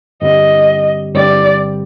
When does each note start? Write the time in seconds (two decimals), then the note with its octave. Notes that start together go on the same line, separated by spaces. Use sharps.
0.22 G2 D3 G3 C4 G4 D#5
1.15 G2 D3 G3 C4 G4 D5